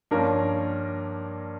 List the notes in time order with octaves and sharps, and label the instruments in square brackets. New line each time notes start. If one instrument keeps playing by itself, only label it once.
[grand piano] G2 F3 A#3 C#4 A#4